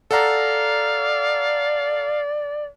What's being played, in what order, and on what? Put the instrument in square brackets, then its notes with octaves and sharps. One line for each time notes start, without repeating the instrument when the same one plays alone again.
[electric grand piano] A4 F#5 A#5 [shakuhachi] D5 [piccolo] F5